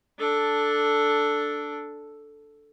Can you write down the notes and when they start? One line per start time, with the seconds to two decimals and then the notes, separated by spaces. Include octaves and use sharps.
0.19 D4 A4